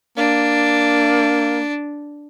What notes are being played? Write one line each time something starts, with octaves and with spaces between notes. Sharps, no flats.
A#3 D4